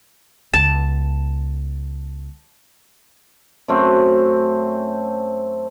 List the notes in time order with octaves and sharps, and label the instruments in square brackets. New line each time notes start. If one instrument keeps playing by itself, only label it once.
[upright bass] C#2 B3 [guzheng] A5
[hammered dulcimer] F#2 A3 C4